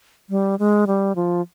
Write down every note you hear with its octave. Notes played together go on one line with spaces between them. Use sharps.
G3
G#3
G3
F3